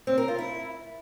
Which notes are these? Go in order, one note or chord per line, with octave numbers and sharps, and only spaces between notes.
C4
A#4
F4
E4